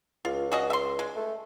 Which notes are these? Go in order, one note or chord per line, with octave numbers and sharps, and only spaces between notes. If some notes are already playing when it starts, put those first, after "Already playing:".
C#2 F4
F#4 G#4 D#5
E5 C6
G#3
A3